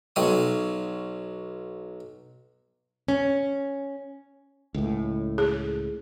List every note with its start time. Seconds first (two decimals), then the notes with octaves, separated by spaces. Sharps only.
0.16 B1 F#3 D#6
3.08 C#4
4.74 C#2 A2
5.38 G#4